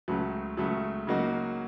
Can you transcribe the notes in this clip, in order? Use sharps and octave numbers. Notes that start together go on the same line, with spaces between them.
C#2 C#3 F#3 A3
C#2 C#3 F#3 A3
C#3 F#3 A#3 D#4 F#4